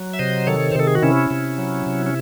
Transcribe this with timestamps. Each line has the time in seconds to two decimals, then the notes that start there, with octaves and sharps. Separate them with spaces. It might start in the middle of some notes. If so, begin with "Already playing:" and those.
Already playing: F#3
0.13 E5
0.19 C3 C5 D#5
0.47 D#3 A4 C#5
0.72 C5
0.75 C3 A4
0.87 G#4
0.95 F#4
1.02 C3 C#4 E4
1.31 C3
1.58 F#3
1.86 C3
2.06 C#4